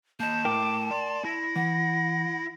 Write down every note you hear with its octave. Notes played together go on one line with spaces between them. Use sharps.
A#3 D#5 A5 G6
A3 E4 A#4 G5 D6
D5 C6
E4 A#6
E3 F#5